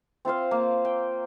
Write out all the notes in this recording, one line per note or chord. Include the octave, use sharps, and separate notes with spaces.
C4 F4 C5 F5
A#3
G5